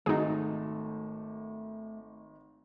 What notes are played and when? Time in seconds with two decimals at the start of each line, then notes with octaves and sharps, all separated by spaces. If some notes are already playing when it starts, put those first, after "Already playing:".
0.06 G#1 D#3 A3 D#4 F#4 G#4